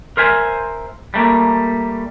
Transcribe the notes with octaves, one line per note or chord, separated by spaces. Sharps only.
A#4 C5 E5 G#5
G3 A3 A#3